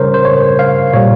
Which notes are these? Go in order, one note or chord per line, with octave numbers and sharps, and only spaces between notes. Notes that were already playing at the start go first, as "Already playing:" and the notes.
Already playing: C#3 G3 A#4 C5 C#5
C5
C#5
F5
A#2 G3 C#5